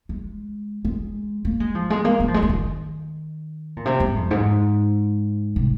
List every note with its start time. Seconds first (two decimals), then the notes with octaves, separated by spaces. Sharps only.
0.09 G#3
0.85 G#3
1.45 A#3
1.60 G#3
1.75 F3
1.90 G#3
2.05 A#3
2.20 A#3
2.28 F3
2.34 G#3
2.42 F3
2.49 D#3
3.77 A#2
3.85 C3
4.00 G#2
4.15 F2
4.31 G#2
5.56 C3